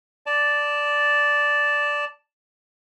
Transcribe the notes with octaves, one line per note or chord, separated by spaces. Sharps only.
D5 A5